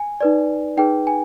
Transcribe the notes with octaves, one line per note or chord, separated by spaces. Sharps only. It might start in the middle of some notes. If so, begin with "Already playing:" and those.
Already playing: G#5
D#4 B4 D5
D#4 G#4 B4 G5
G#5